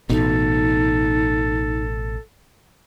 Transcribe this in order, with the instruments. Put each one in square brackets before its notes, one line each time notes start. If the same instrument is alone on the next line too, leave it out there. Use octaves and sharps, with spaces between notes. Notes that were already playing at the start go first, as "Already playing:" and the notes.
[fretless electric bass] A1 B2 [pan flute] D#4 [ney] A4